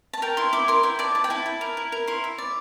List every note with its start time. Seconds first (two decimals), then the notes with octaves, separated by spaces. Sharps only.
0.13 A5
0.22 A#4 G5
0.37 E4 C6
0.53 E4 D6
0.68 A#4 C6
0.83 E4 G5
0.99 D5 A5
1.15 E4 A5
1.24 G5
1.30 E4 A5
1.46 E4
1.61 A#4
1.77 E4
1.92 A#4
2.07 E4 C6
2.24 E4
2.38 D5